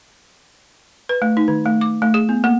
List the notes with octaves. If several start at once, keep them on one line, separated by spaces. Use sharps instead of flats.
B4
A3
D#4
D#3
A3
D6
A3
G#4
B3
A#3